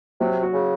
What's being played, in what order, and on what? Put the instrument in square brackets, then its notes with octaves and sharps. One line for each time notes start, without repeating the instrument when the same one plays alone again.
[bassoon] C3 [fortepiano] F#3
[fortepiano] F#4
[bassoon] C#3